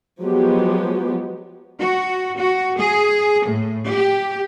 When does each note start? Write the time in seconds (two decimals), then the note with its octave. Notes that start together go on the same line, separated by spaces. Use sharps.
0.23 F3 F#3 G#3 B3 G4
1.79 F#4
2.38 F#4
2.78 G#4
3.48 A2
3.90 G4